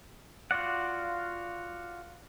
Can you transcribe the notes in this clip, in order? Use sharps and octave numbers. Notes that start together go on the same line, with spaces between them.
F4 F#4 D5 F#5